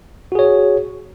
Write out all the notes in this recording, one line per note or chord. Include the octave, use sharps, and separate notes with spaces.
F#4 G#4 C#5